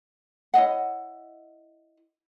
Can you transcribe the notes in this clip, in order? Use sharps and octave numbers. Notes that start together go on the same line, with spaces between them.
E4 C#5 D#5 F#5